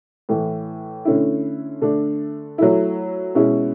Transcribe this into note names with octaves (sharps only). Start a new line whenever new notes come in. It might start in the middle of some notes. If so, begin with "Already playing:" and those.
A2 E3 A3
D3 A3 C#4 E4
D3 A3 D4 A4
F#3 A3 E4
B2 G#3 C#4 E4